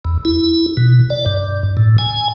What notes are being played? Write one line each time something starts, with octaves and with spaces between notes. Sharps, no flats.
E2
E4
B2
D5
G2
A2
G#5